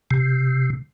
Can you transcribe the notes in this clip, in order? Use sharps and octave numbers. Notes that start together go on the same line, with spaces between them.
C3